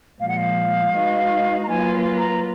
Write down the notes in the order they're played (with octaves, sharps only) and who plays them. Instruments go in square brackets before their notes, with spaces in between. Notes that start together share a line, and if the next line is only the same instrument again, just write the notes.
[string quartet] A#2 F3 G#3 [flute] F5
[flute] F#5
F5
[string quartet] G#3 D#4 F#4 B4 D#5
[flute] A#5
[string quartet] F#3 A#3 F4 B4 [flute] G#5
[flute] A#5